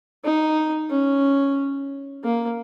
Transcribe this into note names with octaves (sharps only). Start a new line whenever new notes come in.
D#4
C#4
A#3